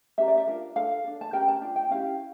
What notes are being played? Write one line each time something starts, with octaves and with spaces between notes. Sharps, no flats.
C#4 G4 A#4 E5
D5
E5
D4 F4 A#4
D4 A4 F5
D4 A4
A5
C#4 G4 A#4 G5
A5
D4 F4
G5
C#4 E4 G4 F5